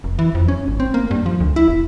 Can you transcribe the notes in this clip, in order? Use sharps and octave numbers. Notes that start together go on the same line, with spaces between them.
F1
E3
F2
C#4
G#1
C4
A#3
G2
F3
D2
E4
E1